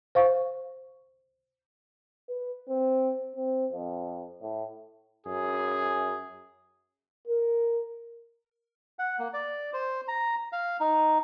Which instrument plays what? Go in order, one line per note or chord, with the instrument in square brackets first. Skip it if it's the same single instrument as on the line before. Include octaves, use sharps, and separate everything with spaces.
[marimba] C5 F5 C#6
[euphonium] B4
C4
C4
F2
A2
[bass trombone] F#2 [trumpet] G#4
[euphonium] A#4
[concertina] F#5
A#3
D5
C5
A#5
F5
D#4